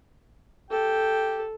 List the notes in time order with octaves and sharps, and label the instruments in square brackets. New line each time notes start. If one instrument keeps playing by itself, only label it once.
[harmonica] G4 G5 [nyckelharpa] A4